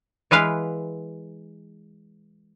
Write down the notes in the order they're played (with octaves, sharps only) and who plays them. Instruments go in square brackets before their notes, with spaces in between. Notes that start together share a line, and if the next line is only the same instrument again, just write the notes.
[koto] E3 G#3 B4 F5